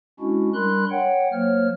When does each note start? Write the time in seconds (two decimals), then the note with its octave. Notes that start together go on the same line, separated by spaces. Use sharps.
0.20 G#3 C#4 D4 E4 F#4
0.54 G3 D4 A#4 B5 C6 F#6
0.91 C#5 F#5 G5
1.33 F#3 A#3 C5 C#5 F6